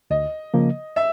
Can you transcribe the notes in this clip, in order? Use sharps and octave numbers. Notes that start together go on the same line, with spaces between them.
D2 D#5
C#3 F3 A#3
E5